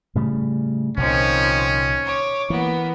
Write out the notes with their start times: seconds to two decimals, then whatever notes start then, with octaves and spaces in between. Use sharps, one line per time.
0.15 A2 C#3 G3
0.97 C2 A#2 D#3 F3 C4 C#4
2.05 C#5 D6
2.50 E3 A#3 B3